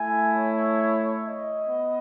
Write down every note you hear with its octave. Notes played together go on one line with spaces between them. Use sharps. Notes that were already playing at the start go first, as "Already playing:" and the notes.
Already playing: A3 E4 G#5
C#5
D#5
B3